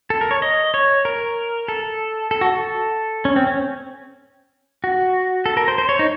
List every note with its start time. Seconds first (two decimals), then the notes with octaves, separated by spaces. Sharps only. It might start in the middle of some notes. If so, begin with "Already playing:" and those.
0.10 A4
0.21 A#4
0.31 C#5
0.42 D#5
0.74 C#5
1.05 A#4
1.68 A4
2.31 A4
2.41 F#4
2.52 A4
3.25 C#4
3.36 C4
3.47 C#4
4.84 F#4
5.46 A4
5.57 A#4
5.68 C5
5.78 C5
5.89 C#5
5.99 D#4